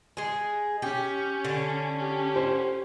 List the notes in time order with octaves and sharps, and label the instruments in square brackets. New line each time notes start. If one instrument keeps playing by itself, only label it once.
[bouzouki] G#3 G#4
[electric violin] C#4 [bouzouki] G4
[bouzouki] D3
[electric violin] C#4 G4
[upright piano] C5